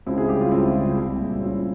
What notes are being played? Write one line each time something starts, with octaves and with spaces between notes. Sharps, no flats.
C#2 C4 E4
G#4
C#3 G3 G4
F4
C#2 C4 E4
C#3 G3
C2
A#2 G#3
C2 C#4 F4